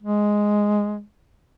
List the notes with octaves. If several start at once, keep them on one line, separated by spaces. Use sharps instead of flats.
G#3